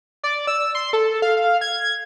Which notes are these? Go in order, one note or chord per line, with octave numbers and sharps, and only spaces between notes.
D5
E6
C6
A4
F5
F5
G#6